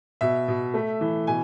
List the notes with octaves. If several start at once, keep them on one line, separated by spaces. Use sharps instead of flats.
B2 E5
B2
A3
E3
B2 G#5